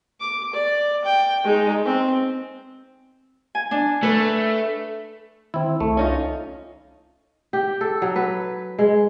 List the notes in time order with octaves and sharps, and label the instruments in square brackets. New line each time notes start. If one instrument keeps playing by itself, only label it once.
[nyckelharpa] D6
D5
G5
G#3 D#4
C4
[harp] G#5
D4
[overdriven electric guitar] A3 [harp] B4
[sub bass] D#3 [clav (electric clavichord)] C4 E4
[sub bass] C2 [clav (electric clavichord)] A3
[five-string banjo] C#4 D#4 F4
[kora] G4
A4
F#3
B4
G#3